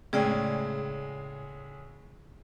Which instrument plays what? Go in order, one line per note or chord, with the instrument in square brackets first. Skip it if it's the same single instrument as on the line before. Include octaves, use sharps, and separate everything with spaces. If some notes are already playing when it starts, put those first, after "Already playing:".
[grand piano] A2 C#3 G#3 [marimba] G#4 D5 G5